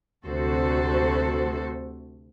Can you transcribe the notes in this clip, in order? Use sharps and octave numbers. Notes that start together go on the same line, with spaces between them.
D2 C3 F#4 A4 C5